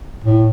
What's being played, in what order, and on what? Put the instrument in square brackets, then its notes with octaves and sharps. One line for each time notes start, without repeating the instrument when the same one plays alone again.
[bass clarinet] A2